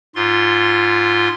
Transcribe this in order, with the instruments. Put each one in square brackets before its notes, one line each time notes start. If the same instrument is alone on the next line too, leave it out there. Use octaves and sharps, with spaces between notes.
[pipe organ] G#2 F4 C6